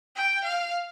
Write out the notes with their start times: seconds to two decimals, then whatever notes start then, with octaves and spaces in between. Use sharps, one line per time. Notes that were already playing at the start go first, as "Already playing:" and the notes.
0.16 G5
0.44 F5